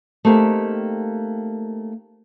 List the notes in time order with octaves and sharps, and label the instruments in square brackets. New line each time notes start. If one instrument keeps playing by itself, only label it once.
[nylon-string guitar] A3 A#3 C4 D#4 G4 A#4